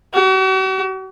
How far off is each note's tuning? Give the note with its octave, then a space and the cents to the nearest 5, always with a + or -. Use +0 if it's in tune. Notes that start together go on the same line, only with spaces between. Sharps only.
F#4 +45